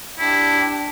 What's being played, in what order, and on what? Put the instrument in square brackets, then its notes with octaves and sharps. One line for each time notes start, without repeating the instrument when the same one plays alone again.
[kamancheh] D4 G4 [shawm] E4